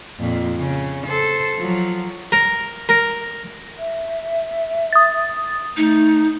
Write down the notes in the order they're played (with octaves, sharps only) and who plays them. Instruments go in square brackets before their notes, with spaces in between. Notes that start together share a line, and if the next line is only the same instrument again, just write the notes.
[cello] F2 A#2
C#3
A4 C5
F3 F#3
[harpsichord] A#4
A#4
[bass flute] E5
[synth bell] D#6 A6
[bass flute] A3 [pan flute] D#4